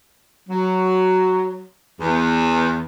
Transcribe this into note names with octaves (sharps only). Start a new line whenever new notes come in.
F#3
E2